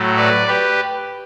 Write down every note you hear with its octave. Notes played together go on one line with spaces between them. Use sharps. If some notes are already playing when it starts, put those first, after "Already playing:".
Already playing: A2 F#3 A3
B4 D5
G4 B4